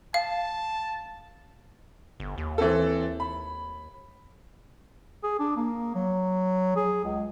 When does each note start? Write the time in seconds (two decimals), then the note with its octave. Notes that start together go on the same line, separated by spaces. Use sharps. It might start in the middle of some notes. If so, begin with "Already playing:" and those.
0.14 F5 A5
2.20 G1
2.38 D#2
2.58 E3 C4 A4
3.20 B5
5.23 G#4
5.39 D4
5.57 A#3
5.95 F#3
6.76 G#4
7.04 C#2